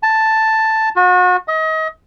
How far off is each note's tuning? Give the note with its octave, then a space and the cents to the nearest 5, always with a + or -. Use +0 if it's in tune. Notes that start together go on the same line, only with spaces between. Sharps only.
A5 +5
F#4 -35
D#5 +35